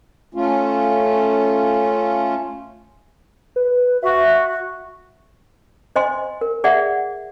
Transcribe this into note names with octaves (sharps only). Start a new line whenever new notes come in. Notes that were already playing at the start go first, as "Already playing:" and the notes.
A3 C#4 F4
B4
F#4 E5
C5 D#5 G#5 C6
A#4
G#4 D5 E5 F#5